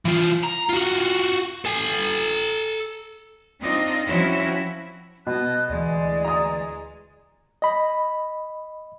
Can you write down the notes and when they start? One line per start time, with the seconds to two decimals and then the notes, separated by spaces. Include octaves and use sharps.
0.05 E3 F4
0.43 A#5
0.69 F4 F#4
1.65 A4 G#5
3.61 C4 D4 D#4 F4 D#5
4.06 F3 C4 C#4 E4 F#4 E5
5.27 B2 D#5 A5 F#6
5.69 D2 E3 G#3 D5
6.25 A#5 D#6
7.62 D#5 B5